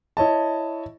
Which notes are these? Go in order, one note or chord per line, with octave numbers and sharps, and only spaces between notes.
E4 C#5 D#5 A5